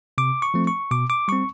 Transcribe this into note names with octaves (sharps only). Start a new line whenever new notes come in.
C3 D6
C#6
F3 A3 C4
C#6
B2 D6
D6
G3 C4 C#6